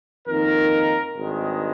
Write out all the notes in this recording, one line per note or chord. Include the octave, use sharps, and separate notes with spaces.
F2 D#3 A#3 D#4 A#4
G#1 G2 D#3 G#3